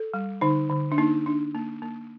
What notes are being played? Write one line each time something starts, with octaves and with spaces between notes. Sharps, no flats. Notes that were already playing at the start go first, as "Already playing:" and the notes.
Already playing: A4
G3
D3 D#4
D3
D4
A#3 D#4
D4
A#3
A#3